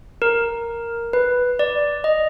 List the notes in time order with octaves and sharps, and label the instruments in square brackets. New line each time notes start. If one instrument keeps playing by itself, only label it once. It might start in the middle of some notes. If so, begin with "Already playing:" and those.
[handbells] A#4
B4
D5
D#5